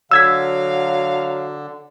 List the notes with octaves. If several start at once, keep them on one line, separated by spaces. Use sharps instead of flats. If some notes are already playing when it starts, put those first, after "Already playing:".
D3 F#3 F5 E6 G#6 B6